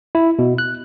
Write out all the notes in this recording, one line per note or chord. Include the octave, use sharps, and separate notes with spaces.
E4
B2
F#6